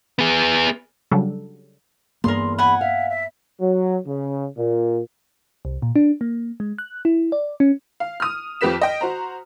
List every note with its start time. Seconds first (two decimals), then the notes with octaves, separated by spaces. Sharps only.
0.19 B3 G#4
1.11 C#3 F#3 G3 D4 A4
2.24 E2 G2 A#3 G#4 A#4 C6
2.58 F#5 G#5 B5
2.81 E5 F5
3.09 E5
3.60 F#3
4.05 C#3
4.57 A#2
5.65 C2
5.82 A#2
5.96 D4
6.21 A#3
6.60 G#3
6.78 F#6
7.05 E4
7.32 D5
7.60 C#4
8.00 F5
8.20 D#6 F6
8.61 F2 F3 G4 B4 B6 E7
8.81 D#5 G5
9.01 F#4 C5 A#5